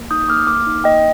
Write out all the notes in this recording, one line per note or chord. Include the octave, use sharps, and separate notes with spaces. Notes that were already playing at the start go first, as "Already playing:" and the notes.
Already playing: A#3
D#4 D#6 G6
A#3 D6 F6
A#3 D6 F6
D#4
A#3 D#5 G5